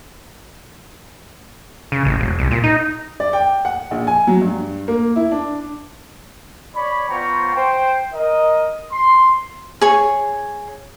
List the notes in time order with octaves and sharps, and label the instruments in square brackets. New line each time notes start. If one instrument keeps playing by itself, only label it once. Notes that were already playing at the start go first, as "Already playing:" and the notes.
[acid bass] C#3
A1
E1
C2
A#2
D#4
[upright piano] D5
G5
F#5
A#1
G#5
F#3
G2
A#3
E4
D4
[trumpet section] C#5 D5 B5
B3 F4 C5 G5 A#5 C#6
C5 G5
A#4 D#5
C6
[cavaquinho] G#4 C#5